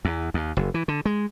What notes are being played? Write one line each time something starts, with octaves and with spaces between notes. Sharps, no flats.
E2
D#2
F#1
E3
D3
G#3